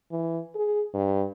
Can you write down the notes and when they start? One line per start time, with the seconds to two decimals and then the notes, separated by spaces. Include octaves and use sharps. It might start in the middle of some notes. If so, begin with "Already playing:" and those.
0.12 E3
0.55 G#4
0.94 G2